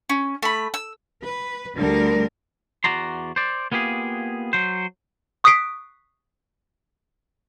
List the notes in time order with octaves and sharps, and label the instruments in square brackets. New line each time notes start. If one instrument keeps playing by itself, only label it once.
[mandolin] C#4
A3 B5
E6
[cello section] B4
D2 D3 G3 A#4
[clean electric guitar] E2 F#4 D5 A#5 C6
C5 D5
A#3 B3 F4 G4 G#4
F#3 C5
[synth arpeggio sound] C#6 D#6 F#6 B6 C7 D7